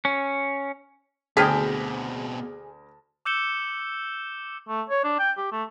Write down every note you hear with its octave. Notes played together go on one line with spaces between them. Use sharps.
C#4
D2 B2 C4 G#4 G5 A5 F6 B6
D6 E6 G6 C#7 E7 G7
A3
C#5
D4
G5
G4
A3